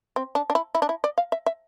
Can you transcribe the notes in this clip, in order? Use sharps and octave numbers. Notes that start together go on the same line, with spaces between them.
C4
D4
D4
E4
E4
D4
E4
D5
F5
E5
E5